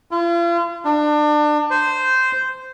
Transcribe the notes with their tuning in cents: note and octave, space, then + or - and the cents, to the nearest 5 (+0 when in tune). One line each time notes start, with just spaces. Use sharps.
F4 -40
D4 +30
C5 -10